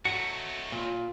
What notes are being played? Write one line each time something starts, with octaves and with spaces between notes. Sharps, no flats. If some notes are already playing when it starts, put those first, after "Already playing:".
F#3 A3 F#4 C#7
A#2 F4